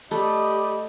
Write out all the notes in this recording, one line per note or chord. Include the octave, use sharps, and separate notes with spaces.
A3 G4 D5 D#5 B5